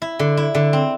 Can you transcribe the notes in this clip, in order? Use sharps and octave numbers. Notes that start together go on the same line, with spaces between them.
E4
D3
E4
D3
C4